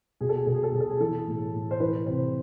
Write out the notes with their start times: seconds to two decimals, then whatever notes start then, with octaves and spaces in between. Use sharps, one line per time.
0.21 B2 G#4
0.29 A4
0.37 G#4
0.46 B2 A4
0.55 G#4
0.63 A4
0.72 B2 G#4
0.80 A4
0.90 G#4
1.00 E3 A4
1.27 A2
1.54 A2
1.71 C5
1.80 E3 B4
2.07 C3 C5